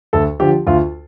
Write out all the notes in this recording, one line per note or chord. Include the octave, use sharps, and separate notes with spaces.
D2 A4
D3 F3 G4
D2 F4